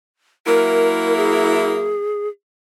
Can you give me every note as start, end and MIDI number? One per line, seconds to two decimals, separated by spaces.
0.46 2.00 54
0.46 2.00 58
0.46 2.00 64
0.46 1.16 70
1.17 2.28 68